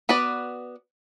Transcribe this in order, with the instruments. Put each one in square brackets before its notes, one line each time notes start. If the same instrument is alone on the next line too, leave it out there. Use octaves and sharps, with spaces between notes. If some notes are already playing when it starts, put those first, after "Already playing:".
[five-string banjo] B3 F#4 B4 D5